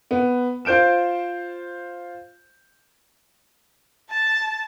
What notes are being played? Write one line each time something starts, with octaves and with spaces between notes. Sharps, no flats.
B3
F4 C5 G6 D7 E7
A5